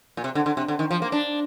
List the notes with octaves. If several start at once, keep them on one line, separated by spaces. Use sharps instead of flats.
A#2
C3
D3
D3
C3
D3
D#3
F3
A#3
D4